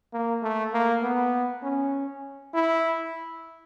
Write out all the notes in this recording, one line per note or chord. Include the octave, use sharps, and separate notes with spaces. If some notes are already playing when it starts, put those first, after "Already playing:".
A#3
A3
A#3
B3
C#4
E4